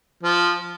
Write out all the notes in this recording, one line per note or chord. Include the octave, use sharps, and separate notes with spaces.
F3